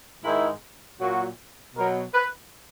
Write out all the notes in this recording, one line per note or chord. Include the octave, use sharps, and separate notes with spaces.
G#2 D#3 G#3 E4
A#2 F#3 F#4
B2 F#3 A#4
B4